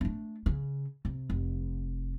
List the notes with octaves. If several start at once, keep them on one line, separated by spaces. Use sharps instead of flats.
A3 D4
C#3
C3
F1